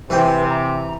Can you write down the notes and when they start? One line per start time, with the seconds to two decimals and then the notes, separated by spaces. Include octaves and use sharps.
0.10 C3 E3 B4 E5 G5
0.50 A#5